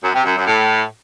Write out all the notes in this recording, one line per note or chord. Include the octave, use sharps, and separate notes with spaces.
F#2
C3
F#2
F#2
A2